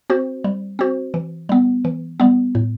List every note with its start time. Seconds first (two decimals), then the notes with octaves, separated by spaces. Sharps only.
0.10 C4 F#4 C5
0.44 G3
0.79 C4 F#4 C5
1.14 E3
1.49 G3 B3
1.85 E3
2.20 G3 B3
2.55 A2